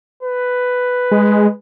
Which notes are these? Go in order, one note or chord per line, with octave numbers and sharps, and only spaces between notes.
B4
G#3